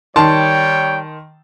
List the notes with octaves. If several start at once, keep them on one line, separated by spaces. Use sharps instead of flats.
D#3 G3 C#5 G5 A5 C6